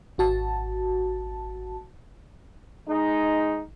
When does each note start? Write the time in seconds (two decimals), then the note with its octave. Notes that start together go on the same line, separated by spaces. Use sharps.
0.18 G#1 F#4 A5
2.89 G#3 D#4